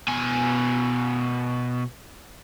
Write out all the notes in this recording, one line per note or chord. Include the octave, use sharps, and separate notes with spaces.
B2 G#5